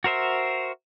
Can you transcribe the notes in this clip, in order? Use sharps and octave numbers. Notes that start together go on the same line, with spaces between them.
F#4 A#4 C5 E5